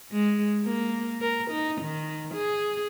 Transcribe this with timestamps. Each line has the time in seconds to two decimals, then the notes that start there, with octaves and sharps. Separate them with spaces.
0.12 G#3
0.64 A#3
1.21 A#4
1.50 D#4
1.81 D#3
2.34 G#4